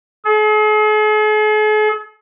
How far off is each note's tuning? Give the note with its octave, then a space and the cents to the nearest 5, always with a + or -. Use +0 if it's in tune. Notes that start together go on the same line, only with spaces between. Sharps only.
G#4 +45